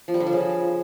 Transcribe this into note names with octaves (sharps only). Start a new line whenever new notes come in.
F3
G3
D3
F3
C#3